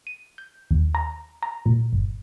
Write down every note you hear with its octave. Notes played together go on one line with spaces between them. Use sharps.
D#7
G6
D#2
A#5
A#5
A#2
G1